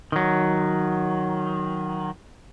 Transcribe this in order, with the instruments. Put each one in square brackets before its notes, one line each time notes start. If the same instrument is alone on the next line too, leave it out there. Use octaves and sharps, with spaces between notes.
[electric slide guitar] D#3 F#3